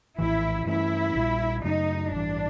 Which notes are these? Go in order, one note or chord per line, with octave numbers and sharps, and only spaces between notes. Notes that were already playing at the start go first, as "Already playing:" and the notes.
A#1 A2 E3 E4
G2 E3 A3 C#4 E4
A#1 A#2 G3
F#2 C#3 F#3 A3 D#4
A1 G2 E3 D4